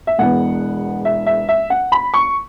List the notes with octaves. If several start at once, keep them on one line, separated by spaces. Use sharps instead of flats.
E5
E1 E2 E3 B3 F#5
E5
E5
E5
F#5
B5
C#6